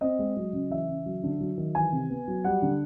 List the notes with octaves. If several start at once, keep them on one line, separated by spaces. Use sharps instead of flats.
C4 D#5
G#3
F#3
C#3
E3 E5
C#3
F#3
D3
F#3
D#3
E3 G#5
C3
B3
F#3
G3 F#5
D3